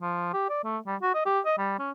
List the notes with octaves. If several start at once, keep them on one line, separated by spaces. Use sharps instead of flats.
F3
G4
D5
A3
G3
F#4
D#5
G4
D#5
G3
C#4